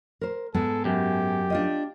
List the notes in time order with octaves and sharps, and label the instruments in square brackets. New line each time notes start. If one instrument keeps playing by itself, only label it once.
[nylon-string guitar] A#4 C5
[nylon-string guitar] G#2 G#3 B3 [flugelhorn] A4
[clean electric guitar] F#2 [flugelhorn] G4
[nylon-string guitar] D4 F4 D#5